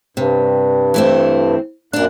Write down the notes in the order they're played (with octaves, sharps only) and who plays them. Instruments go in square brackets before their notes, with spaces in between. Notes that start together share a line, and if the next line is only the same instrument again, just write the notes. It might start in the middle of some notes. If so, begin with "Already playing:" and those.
[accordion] G2 [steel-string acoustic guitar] C3
[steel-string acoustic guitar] E3 A3 C4
[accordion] F#2 A#2 F#6 [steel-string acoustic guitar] D4 A#4